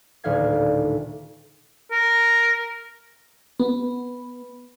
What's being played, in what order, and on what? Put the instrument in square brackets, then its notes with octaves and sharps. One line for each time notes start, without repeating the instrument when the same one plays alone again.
[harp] D#1 D2 A2 F5 G#6
[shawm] A#4
[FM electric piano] B3